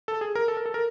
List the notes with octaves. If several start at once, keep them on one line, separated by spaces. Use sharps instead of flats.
A4
G#4
A#4
A4
A#4
A4
A#4